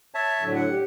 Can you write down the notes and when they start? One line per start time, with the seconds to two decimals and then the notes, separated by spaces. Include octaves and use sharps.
0.15 C#5 E5 A5
0.41 A2 D3 F#3
0.55 F#5
0.69 G4